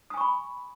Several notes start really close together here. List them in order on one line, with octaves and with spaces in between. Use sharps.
D#6 G#5 C#6 B5